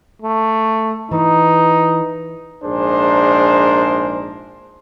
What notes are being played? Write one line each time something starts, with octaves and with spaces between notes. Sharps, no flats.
A3
E3 D#4
A#1 G#2 D4 G#4 A#4 C5